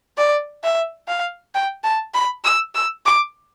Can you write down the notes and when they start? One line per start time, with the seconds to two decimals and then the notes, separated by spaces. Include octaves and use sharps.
0.18 D5
0.63 E5
1.08 F5
1.54 G5
1.84 A5
2.14 B5
2.44 E6
2.75 E6
3.06 D6